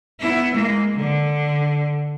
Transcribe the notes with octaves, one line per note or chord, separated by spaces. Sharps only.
B3 E4
G#3 A#3
D3